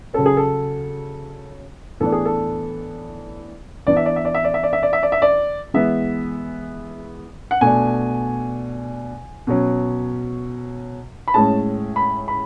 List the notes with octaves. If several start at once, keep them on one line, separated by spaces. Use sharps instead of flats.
C#3 F#3 C#4 A4
G#4
A4
A2 E3 B3 D4 A4
G#4
A4
E3 B3 D4 D5
E5
D5
E5
D5
E5
D5
E5
D5
E5
D5
E5
D5
E5
D5
E3 G#3 B3 E5
F#5
B2 A3 D4 G#5
B2 F#3 C#4
B5
A2 G#3 C#4 A5
B5
B5